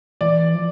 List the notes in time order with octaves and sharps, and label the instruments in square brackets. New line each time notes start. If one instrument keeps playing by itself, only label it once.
[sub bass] E3 [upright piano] D5
[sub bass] F3